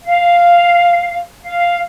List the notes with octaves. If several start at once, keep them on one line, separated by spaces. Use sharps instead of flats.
F5
F5